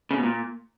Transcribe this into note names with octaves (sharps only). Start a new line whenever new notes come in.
C#3
B2
A#2